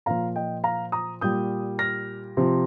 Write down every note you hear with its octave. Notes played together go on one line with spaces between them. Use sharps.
A#2 F3 F5 A#5
D#5 G5
F5 A#5
A#5 D#6
A#2 G3 D#6 G6
F6 A#6
C3 F3